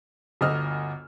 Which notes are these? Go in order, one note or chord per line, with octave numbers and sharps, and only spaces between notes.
G1 D2 D#5 E6 F6